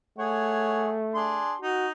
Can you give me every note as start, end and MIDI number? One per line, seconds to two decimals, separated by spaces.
0.19 1.46 57
0.19 0.97 68
0.19 0.97 73
0.19 0.97 78
1.14 1.55 62
1.14 1.55 68
1.14 1.55 84
1.61 1.92 63
1.61 1.89 66